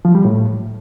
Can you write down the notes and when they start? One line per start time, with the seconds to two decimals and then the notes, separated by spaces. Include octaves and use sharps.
0.05 F3
0.15 G3
0.25 A2